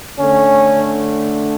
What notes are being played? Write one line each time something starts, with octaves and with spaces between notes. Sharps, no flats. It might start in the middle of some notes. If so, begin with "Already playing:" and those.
D3 A3 C#4